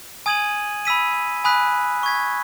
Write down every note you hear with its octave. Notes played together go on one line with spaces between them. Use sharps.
G#5 D#6 G#6 D#7 F#7
B5 E6 B6 D#7
G#5 B5 D#6 F#6 B6
C#6 G#6 B6